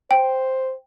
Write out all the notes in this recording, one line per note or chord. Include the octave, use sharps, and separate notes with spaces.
C5 G5